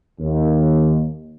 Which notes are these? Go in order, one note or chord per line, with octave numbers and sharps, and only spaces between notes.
D#2